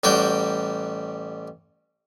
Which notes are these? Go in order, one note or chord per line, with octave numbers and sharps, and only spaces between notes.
A1 G3 F#4 G5